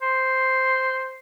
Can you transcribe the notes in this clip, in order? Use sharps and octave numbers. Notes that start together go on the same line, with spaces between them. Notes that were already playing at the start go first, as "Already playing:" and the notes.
C5